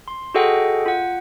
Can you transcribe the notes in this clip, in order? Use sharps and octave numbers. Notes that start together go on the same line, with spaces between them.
C6
F#4 G#4 A4 D#5 F#5 G5
F4 F#5